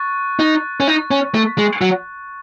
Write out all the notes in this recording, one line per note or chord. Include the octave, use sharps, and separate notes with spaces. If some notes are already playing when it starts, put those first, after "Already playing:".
Already playing: C#6 F#6 A6
D#4
C#4
D#4
C#4
A3
G#3
F#3